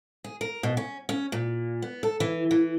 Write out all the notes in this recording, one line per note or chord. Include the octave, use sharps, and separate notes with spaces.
G#4
A#4
B2
C#4
C#4
A#2
B3
A4
E3
E3